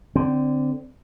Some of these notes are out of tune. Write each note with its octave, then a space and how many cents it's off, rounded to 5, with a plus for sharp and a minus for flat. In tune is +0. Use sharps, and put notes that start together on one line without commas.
D3 +0 C4 -15